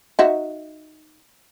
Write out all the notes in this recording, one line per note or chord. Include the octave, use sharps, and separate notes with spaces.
D#4 F#4 E5